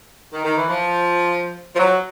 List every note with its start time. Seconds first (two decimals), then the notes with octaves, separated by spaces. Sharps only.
0.33 D#3
0.44 D#3
0.57 E3
0.69 F3
1.74 F3
1.79 F#3